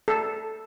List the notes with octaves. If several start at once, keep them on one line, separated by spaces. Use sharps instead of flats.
A4